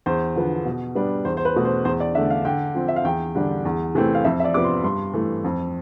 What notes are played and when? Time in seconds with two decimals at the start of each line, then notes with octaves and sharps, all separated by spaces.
0.06 E2 C5
0.36 D3 F3 B3
0.65 B2
0.95 G3 B3 D4
1.25 E2 C5
1.37 C5
1.45 B4
1.56 B2 A3
1.65 C5
1.85 E2 C5
2.00 D5
2.15 D3 A3 E5
2.30 F5
2.45 D3 G5
2.75 F3 C4
2.88 E5
2.96 F5
3.04 E2 G5
3.35 D3 G3 D4
3.65 E2
3.95 C3 E3 A3 C4
4.15 F5
4.24 F2 E5
4.40 E5
4.44 D5
4.54 C3 F3 B3 D6
4.64 C6
4.84 G2 C6
5.14 E3 A3
5.44 F2